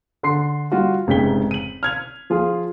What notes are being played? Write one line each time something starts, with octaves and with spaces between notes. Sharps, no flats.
D3 C6 C7
G3 F4 F#4
F1 G#2 C#3 G5 B6 G7
D#7 F#7
F6 G#6 F7
F3 F4 G#4